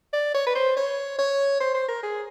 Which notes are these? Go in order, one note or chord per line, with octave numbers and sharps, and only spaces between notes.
D5
C#5
B4
C5
C#5
C#5
C5
C5
A#4
G#4